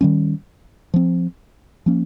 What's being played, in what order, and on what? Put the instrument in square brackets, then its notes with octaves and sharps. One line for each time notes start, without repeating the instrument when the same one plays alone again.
[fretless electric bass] D#3 G3 C#4
F3 C4
F3 A#3 C#4